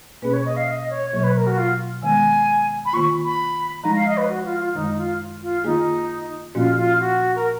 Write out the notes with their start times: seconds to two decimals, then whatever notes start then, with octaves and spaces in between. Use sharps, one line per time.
0.22 B2 A#3 C#4 G#4 B4
0.33 C#5
0.45 D#5
0.56 F5
0.68 D#5
0.90 C#5
1.13 B2 F#3 A#3 C#5
1.24 B4
1.36 A#4
1.46 F#4
1.57 F4
2.03 D#3 G#3 B3 G#5
2.85 B5
2.93 D#3 A#3 F4 C#6
3.24 B5
3.83 F3 G#3 D#4 A#5
3.95 F5
4.07 D#5
4.17 B4
4.29 F#4
4.44 F4
4.59 F4
4.74 F#2 D#3 G#3 D#4
4.97 F4
5.42 F4
5.64 D#3 A#3 D#4 F4 G#4
6.55 A#2 F3 A#3 C#4 F4 F#4
6.77 F4
7.00 F#4
7.35 A#4